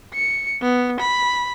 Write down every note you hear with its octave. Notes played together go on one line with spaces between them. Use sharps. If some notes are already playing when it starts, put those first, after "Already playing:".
C#7
B3
B5